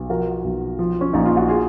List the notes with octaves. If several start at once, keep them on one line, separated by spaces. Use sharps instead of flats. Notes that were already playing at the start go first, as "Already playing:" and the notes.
Already playing: B1
F3 F#4 A#4
B1
F3
C#4
A#1 D#4
F4
F#4
F4 G#4